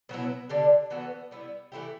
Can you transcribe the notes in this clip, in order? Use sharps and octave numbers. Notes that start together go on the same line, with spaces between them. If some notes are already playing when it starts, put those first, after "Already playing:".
B2 F#3 B3 E4
D3 G3 D4
E3 B3 F#4 A4
G3 B3 E4
E3 A3 E4 G4